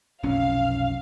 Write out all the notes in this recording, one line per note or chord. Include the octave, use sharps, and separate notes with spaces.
F1 B1 C#4 F5